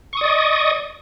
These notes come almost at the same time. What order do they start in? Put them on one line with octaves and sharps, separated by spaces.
C#6 D#6 D5 D#5